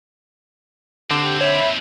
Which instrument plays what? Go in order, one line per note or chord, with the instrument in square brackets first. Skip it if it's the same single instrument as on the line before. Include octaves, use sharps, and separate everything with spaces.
[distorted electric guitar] D#2 C4 [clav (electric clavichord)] D3 [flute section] G4
[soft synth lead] C#5 [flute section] E5 B5